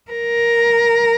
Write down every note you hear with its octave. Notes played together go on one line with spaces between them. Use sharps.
A#4